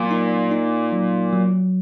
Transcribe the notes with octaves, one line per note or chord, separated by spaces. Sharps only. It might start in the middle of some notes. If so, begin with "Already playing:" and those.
Already playing: A#2 F#3
D#4
D#4
F#3
F#3